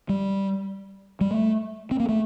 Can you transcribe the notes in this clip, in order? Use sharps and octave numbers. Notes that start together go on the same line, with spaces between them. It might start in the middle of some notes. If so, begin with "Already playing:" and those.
G3
G3
A3
C4
A#3
A3